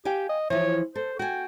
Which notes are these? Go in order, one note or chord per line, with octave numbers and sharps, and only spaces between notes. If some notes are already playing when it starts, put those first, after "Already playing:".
G4 F5 G5 G#5
D#5
E3 F3 C#5
A4 C5
F#4 G5 G#5